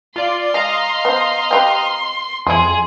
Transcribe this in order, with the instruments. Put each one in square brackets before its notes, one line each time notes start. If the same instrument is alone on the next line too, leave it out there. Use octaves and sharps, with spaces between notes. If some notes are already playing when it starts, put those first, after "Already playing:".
[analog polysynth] F4 D5 [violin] C6
[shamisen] G#3 [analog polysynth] D#5 F5 A#5
[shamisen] B3 C5
C4 G4 B4
[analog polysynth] F2 [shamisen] G#3 E4 [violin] G#4 [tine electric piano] C6